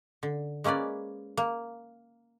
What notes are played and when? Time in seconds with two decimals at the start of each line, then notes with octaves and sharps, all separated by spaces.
0.23 D3
0.64 G#3 A#3 C#4 B4 D5
1.37 A#3